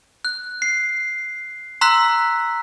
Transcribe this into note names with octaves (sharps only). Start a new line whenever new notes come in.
F#6
C7
A#5 C6 E6 F#6 B6